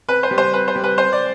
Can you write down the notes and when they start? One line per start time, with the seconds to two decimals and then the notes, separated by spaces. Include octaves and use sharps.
0.09 C4 B4
0.23 C5
0.31 G3
0.38 C5
0.53 C4 B4
0.68 C5
0.76 G3
0.84 B4
0.98 C4 C5
1.12 D5